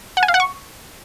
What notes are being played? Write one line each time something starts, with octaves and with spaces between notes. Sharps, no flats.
F#5
G#5
F5
F#5
C#6